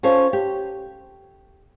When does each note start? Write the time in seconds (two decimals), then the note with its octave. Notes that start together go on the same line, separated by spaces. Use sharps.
0.03 C#4 F4 A4 C5 C#5
0.33 G4